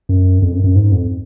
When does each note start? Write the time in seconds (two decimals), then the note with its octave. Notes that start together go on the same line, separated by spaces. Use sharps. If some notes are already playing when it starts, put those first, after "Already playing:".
0.09 F#2
0.42 F2
0.53 F#2
0.64 F#2
0.76 G#2
0.92 F2